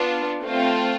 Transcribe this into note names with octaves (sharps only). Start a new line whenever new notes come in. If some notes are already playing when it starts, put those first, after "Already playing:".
Already playing: B3 D4 F4
A3 C4 F4